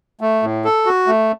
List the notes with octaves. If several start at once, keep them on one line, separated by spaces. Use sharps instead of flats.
A3
A2
A4
F#4
A3